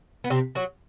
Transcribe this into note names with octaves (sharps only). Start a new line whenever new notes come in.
B3
C3 C4
F#3 F#4